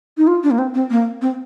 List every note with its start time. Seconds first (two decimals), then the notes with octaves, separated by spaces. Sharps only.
0.18 D#4
0.27 F4
0.43 D4
0.51 A#3
0.59 C4
0.74 C4
0.90 A#3
1.22 C4